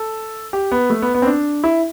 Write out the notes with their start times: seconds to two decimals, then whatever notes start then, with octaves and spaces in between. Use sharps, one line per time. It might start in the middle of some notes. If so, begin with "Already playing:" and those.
Already playing: A4
0.53 G4
0.72 B3
0.90 A3
1.02 B3
1.14 B3
1.22 C4
1.27 D4
1.64 E4